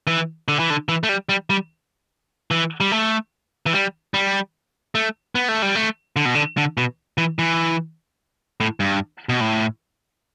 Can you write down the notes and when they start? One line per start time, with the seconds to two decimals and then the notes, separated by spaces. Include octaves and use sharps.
0.07 E3
0.48 D3
0.59 E3
0.70 D3
0.89 E3
1.03 A3
1.09 G3
1.29 G3
1.50 G3
2.51 E3
2.80 G3
2.92 A3
3.66 E3
3.73 G3
4.14 G3
4.95 A3
5.35 B3
5.49 A3
5.62 G3
5.75 A3
6.16 D3
6.25 B2
6.35 D3
6.58 D3
6.77 B2
7.18 E3
7.39 E3
8.60 A2
8.80 G2
9.29 B2
9.41 A2